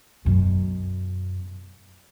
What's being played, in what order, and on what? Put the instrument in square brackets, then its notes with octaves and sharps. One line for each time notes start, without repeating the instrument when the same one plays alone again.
[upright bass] F#2 B2